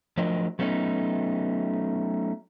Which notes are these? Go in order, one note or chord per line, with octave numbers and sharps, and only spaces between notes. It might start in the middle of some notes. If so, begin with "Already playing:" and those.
F3 F#3 A3 D4 A#4 D#5
F#3 A3 B3 C#4 D#4